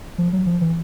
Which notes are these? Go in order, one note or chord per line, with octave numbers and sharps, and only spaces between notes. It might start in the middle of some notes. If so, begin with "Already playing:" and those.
F3
F#3
F3
E3